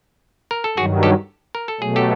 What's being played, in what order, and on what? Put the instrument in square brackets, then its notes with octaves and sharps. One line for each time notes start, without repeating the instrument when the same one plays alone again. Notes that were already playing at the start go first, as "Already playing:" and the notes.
[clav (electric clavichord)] A#4
A4
[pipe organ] G2 D#3 F#3 [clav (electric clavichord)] F#4 G#4
[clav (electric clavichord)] G4 A4
A#4
A4
[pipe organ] B2 F#3 A3 [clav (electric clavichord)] G#4
[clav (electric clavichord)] G4 A4